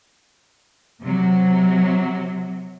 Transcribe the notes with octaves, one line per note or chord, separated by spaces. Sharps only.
C3 F#3